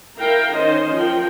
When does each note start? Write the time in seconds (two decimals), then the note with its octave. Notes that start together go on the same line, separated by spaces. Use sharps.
0.19 E4 A#4 F5 G5 A#5
0.54 D#3 C#4 C5 D#5
0.96 F3 A#4 G5